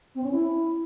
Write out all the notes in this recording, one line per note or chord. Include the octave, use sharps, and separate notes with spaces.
C4
C#4
E4